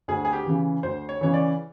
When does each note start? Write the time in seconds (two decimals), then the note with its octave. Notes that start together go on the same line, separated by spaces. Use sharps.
0.08 D2 G#4
0.25 G#4
0.33 G4
0.46 C#3 E3
0.83 D2 C5
1.09 C#5
1.21 C#3 E3 C#5
1.34 D5